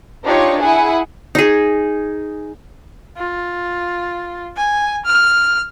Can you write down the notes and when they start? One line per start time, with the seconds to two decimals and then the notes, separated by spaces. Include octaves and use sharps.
0.25 D4 D#4 F4 G4 C#5
0.62 E4 G#4 F#5 G#5
1.35 D#4 G#4
3.17 F4
4.57 G#5
5.05 F6